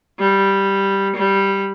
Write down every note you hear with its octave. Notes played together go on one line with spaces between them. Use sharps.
G3
G3